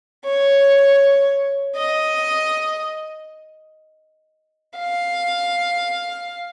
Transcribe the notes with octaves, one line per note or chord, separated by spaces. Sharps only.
C#5
D#5
F5